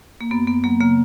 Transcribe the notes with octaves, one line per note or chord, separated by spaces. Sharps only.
A#3
F#2 B3
F#2 B3
F#3 A#3
C#3 A#3